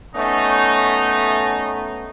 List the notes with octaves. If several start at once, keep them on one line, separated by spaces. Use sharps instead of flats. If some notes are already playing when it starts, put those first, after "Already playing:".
A3 B3 C#4 D#4